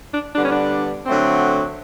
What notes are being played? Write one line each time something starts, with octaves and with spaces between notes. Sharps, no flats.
D4
D3 G3 B3 D4
C#4
D4
D3 F#3 A3 C4